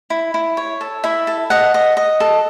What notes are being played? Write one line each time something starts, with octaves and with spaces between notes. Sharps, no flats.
E4
E4
C#5
A4
E4 E5
A4
D#5 F#5
D#5
D#5
A4